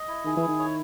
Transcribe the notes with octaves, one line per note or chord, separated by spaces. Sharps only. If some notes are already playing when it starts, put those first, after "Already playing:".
Already playing: D#5
E4
D#3 G#4
E3
E4
D#3
C#5